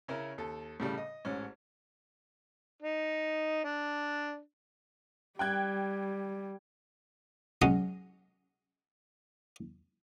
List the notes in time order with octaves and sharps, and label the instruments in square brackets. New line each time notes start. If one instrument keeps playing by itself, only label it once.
[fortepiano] C#3 C#4 E4 A#4
D#2 A4
A2 C#3 G3
D#5
A1 G#2 C#4
[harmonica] D#4
D4
[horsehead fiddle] G3 [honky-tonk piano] G5 F#6 G#6
[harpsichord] F#3 G#3 C#4 D#6